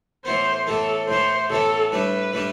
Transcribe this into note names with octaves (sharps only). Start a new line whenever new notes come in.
A2 E3 B3 C5
A2 E3 B3 A4
A2 E3 B3 C5
A2 E3 B3 A4
A2 G3 D4 B4
A2 G3 D4